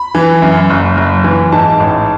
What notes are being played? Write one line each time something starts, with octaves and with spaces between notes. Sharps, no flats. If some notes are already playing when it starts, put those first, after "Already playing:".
Already playing: B5
E3
F#2
F#1
F#1
E3
G#2 A5
A1